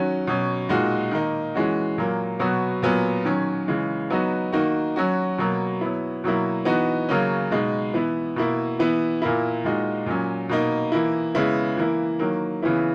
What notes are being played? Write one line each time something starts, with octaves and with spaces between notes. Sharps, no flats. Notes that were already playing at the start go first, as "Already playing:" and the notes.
Already playing: D#3 F#3 C#4 F#4
B2 F#3 C#4
A#2 G#3 D#4 F#4
D#3 A#3 D#4
E3 G#3 C#4 F#4
A#2 F#3 A#3
B2 F#3 B3 F#4
A#2 F#3 B3
D#3 F#3 C#4
C#3 E3 G#3
F#3 B3 D#4 F#4
D#3 A#3 D#4 F#4
F#3 C#4 F#4
B2 F#3 A#3
F#3 B3 E4
B2 F#3 A#3 E4
E3 B3 D#4 F#4
C#3 F#3 A#3 C#4
B2 G#3 D#4
E3 B3 E4
B2 A#3 E4
E3 B3 E4
A#2 A#3 E4
A#2 G#3 D#4 F#4
A#2 F#3 C#4
B2 A#3 D#4
E3 A#3 E4
C#3 G#3 B3 E4
E3 A#3 E4
D#3 F#3 A#3
C#3 E3 B3 E4